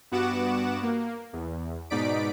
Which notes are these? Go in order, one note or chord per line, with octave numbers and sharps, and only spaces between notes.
G2 B3 F#4 F#5 D6 E7
A#3
E2
G#2 B2 D#4 D5 B6 D7